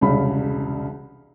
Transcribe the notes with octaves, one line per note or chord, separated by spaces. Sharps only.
E1 C2 C#3 B5